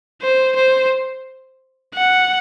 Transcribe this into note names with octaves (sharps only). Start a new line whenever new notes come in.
C5
C5
F#5